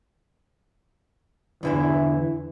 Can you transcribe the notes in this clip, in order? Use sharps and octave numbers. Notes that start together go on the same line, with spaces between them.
E2 D3 E3 E4